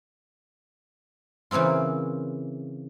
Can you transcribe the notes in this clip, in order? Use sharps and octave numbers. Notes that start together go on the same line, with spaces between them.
C#3 E3 A#3 C4 F4